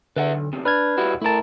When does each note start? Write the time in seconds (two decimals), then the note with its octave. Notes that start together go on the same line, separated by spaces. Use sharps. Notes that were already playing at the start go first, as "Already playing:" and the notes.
0.16 D3 B4 E5 F#5
0.34 B1
0.53 E2 C3
0.65 D4 B4 F6 G#6
0.98 G3 E4 F#4
1.22 A3 E4 A#4 A5